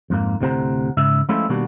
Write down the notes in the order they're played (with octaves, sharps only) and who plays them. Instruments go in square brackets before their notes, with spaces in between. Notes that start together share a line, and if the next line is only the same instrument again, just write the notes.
[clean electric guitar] F2 G#2 A#3
D2 A2 C3 C5 F#5 A#5
G#2 C#3 E5
F3 G#3 A3 C#4 E4 F4
B2 D#3 G3 A#3 D4 F#4